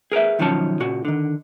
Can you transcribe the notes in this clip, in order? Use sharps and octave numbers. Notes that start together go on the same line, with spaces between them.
G#4 A#4 B4 E5
B1 D#3 F3 F#3 C#4 A5
A#2 C#3 F#4
D3 D#3